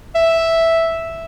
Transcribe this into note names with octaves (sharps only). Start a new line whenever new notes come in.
E5